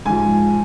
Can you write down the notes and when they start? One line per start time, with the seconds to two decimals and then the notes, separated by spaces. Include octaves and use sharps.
0.05 G#2 F3 G#5